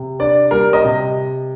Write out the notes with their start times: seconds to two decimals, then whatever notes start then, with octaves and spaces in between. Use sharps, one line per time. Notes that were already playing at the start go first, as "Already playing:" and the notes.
Already playing: C3
0.19 D4 D5
0.51 G3 A#4
0.73 D#5
0.84 C3